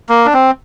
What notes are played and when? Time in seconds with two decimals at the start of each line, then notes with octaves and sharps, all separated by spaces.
0.09 A#3
0.26 D4
0.34 C4